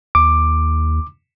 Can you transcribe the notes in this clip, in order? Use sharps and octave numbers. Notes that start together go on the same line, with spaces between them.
D#2 D6